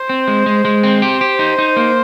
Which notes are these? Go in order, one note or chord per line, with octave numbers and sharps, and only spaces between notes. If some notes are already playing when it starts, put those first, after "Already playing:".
Already playing: C5
C4
G#3
G#3
G#3
C4
G4 C5
G4
D#4
D#4
A#3